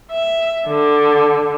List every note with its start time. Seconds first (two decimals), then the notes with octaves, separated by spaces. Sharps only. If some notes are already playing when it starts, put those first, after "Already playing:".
0.12 E5
0.67 D3